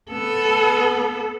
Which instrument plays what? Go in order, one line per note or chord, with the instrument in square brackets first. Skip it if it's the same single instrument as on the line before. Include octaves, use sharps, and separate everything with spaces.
[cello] B3 A4